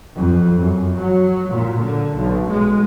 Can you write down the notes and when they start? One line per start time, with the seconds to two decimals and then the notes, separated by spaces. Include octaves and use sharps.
0.16 F2
0.60 F#2
0.97 F#3
1.50 A#2
1.83 D3
2.14 B1
2.49 G#3